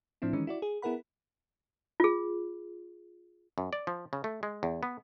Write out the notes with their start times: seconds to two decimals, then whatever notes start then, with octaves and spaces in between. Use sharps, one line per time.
0.22 A2 F3 C4 D4 E4
0.33 D#3 E3 G#3 C#4 D#4
0.47 E4 F#4 D5
0.62 G#4
0.82 B3 E4 G#4 A#4 F#5 B5
2.00 F4 G#4
3.58 F#2
3.73 D5
3.87 F3
4.13 C#3
4.24 A3
4.43 G#3
4.63 E2
4.83 B3